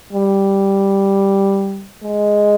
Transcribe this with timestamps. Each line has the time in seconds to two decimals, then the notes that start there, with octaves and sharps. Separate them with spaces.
0.13 G3
2.03 G#3